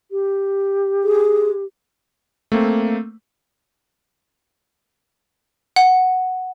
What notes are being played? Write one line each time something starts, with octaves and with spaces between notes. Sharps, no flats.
G4
G#4
A3 A#3 C4
F#5